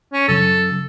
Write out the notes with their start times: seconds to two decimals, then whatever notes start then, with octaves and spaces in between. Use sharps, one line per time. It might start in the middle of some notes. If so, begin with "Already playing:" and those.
0.13 C#4
0.28 F#2 C#3 F#3 A4